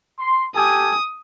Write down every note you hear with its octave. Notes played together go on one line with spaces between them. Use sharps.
C6
G4 A4 G#5 D#6